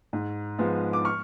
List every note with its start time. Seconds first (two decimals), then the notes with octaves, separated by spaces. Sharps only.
0.13 G#2
0.58 F3 G#3 B3
0.93 D6
1.05 C#6 F6